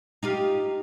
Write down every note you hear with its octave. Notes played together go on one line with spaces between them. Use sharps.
D#4 F4 G4